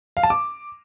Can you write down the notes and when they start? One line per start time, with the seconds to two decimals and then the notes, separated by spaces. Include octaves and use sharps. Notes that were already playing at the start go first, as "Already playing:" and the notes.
0.17 F5
0.23 A5
0.30 D6